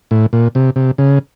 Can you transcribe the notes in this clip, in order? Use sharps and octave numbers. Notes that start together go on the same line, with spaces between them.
A2
A#2
C3
C3
C#3